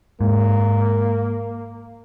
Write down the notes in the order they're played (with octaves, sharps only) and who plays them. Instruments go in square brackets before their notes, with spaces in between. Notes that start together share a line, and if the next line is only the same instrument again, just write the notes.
[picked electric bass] G#2 [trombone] A#3